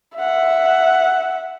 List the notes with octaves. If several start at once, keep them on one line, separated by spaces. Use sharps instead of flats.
E5 F#5